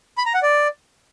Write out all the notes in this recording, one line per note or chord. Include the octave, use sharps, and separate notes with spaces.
B5
A#5
F#5
D5